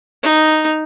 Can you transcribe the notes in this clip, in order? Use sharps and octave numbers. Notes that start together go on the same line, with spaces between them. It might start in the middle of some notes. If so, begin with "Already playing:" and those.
D#4